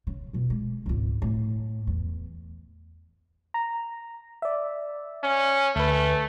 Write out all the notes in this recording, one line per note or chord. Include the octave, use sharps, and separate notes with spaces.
C#3
F2 B2
G#3
G#1 C#2
A2
E2
A#5
D5 E5
C#4
D2 A3 B4